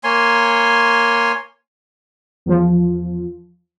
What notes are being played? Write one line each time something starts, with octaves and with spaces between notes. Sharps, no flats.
A#3 C#5 G#5 C6
E2 F3